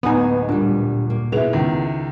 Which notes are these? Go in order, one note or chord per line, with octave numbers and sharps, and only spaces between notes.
D1 A#3 B3 D#4 G#5
A#2 G3 D4
A#3
B2 G#3 B3 E4 F7
C#2 D#3